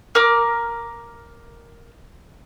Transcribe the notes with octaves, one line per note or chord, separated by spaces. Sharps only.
A#4 D6 F6